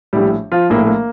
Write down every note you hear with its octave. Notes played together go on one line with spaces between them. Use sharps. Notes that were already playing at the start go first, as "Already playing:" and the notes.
A#1 A2 G3 G4
F3 F4
A#1 A2 A#3
A3
A#3